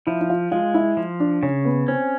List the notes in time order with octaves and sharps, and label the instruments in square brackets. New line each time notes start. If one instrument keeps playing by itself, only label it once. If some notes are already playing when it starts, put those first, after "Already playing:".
[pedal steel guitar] F3 [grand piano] E4
[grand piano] E4
F4
[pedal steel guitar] G#3 [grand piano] F4
[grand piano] E4
[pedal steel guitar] F3
[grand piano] D4
[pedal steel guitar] C#3 [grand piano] C#4
[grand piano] B3
[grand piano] C4 [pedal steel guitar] C#4